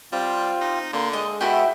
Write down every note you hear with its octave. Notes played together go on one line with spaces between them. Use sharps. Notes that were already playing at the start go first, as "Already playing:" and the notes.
G3 C4 F4
D#4
D3 A#3 C6
G#3 D#5
B2 E4 F#4 G4